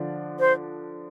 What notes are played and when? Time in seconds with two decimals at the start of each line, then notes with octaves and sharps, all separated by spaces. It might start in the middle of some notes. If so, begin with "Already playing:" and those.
Already playing: D3 F3 D4
0.40 C5